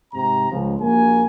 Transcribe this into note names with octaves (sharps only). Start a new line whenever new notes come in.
G#2 C3 A#5
C#2 F3
A#1 A#3 F#4 G#5